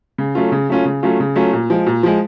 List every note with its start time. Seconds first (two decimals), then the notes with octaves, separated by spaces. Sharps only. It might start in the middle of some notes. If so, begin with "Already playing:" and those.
0.18 C#3
0.35 F#3 A3 C#4 F4
0.52 C#3
0.69 F#3 A3 C#4 F4
0.85 C#3
1.03 F#3 A3 C#4 F4
1.20 C#3
1.35 F#3 A3 C#4 F4
1.53 A#2
1.70 F3 G#3
1.87 A#2
2.03 F3 G#3